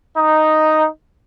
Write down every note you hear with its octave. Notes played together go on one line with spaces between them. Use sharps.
D#4